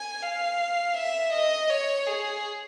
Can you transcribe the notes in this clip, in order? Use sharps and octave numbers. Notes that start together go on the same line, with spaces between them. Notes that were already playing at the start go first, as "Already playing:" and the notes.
Already playing: G#5
F5
E5
D#5
C#5
G#4